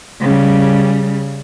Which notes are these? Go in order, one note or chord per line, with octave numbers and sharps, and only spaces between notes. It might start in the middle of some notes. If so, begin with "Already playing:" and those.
C#3 G3